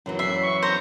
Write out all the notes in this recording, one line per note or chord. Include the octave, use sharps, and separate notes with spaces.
F#2 E3 F#3
E5 C7
C#6
C5 A#5